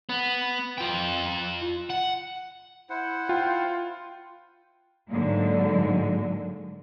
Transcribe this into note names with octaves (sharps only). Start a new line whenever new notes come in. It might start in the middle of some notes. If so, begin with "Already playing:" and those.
B3
F4 G5
F#5
E4 C5 F#5
F4 G5
G#2 D3 F#3 G#3 A#3